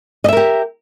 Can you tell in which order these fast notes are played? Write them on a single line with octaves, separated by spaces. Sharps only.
D#5 E5 A#4 G4